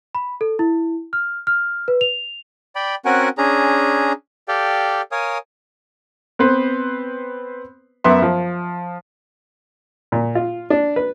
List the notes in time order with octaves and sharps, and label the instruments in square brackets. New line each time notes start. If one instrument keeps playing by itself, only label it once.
[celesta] B5
A4
E4
F6
F6
B4
F7
[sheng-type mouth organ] D5 G5 B5
C4 C#4 F#4 A#4 F#5 G#5
C#4 D4 G#4 A#5
G4 A4 D5 F5 G5
A#4 C#5 F5 G#5 D#6
[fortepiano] B3 C4 B4 C5
F#2 B3 E5 C6
F3
A#2
F4
D4
B4